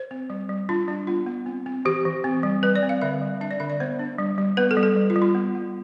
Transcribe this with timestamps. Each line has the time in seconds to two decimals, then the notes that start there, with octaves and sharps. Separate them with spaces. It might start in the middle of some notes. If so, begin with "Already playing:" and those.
Already playing: C5
0.11 C4
0.30 G3
0.49 G3
0.69 D4 F4
0.88 G3 D4
1.07 B3 F4
1.27 B3
1.46 C4
1.66 C4
1.85 E3 G4
2.05 E3
2.24 C4
2.43 G3
2.63 G3 B4
2.75 D5
2.83 C4
2.89 F5
3.01 D3 E5
3.22 G3
3.41 D4 E5
3.51 D5
3.60 D3 E5
3.70 D5
3.80 B3 C5
3.99 D4
4.18 G3
4.38 G3
4.57 B3 B4
4.71 A4
4.77 G3
4.83 A4
4.96 G3
5.10 F4
5.16 G3
5.22 F4
5.35 B3
5.55 B3